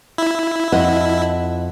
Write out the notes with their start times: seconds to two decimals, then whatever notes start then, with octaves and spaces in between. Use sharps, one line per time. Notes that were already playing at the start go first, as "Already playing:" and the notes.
0.18 E4
0.72 F2 D#5 F#5